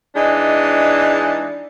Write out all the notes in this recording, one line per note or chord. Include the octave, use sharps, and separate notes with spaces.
E3 G#3 D4 D#4